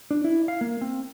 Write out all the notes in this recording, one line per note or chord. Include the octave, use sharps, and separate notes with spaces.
D4
E4
F5
A#3
C4